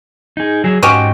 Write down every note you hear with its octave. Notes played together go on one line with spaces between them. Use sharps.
D#4 G#4
F#3 G#4
G#2 C#4 F#4 G4 D#5 G5